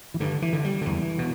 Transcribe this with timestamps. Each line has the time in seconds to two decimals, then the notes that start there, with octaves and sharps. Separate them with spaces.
0.14 E3
0.20 G2 D3
0.42 E3
0.53 D3
0.64 G3
0.82 D3
0.86 E2 E3
1.18 B2